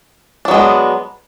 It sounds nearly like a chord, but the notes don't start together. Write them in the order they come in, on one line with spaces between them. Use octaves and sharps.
D4 F#3 G#3 B3